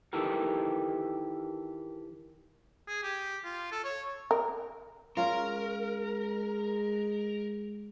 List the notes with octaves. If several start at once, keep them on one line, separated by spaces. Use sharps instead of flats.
D#3 E3 G4 A4 A#4
G#4
G4
F4
A4
C#5
A#4
G#3 C#4 F4 A#4